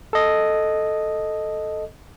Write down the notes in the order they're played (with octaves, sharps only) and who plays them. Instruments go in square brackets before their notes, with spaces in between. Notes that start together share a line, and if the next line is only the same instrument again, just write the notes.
[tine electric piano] A4 D#5